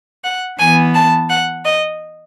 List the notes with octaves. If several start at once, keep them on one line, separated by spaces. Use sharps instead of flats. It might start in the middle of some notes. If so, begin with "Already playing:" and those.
F#5
E3 B3 G#5
A5
F#5
D#5